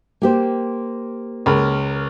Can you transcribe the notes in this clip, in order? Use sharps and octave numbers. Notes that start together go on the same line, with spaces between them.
A#3 G4 C5
C#2 A#4 B5